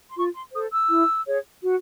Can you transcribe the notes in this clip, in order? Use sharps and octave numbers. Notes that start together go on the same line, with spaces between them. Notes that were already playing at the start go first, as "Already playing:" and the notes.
C6
F4 C#6
C6
A4 C5 D#6
E6
E4
G#4 C#5
F#4